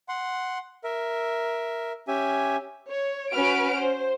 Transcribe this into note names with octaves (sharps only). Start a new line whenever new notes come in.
F#5 C6
A#4 E5
C#4 G4 E5 G#5
C#5
C#4 F#4 B4 F6 D7
C5